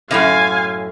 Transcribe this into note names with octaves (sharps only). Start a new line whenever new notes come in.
F#2 A2 C3 F5 G#5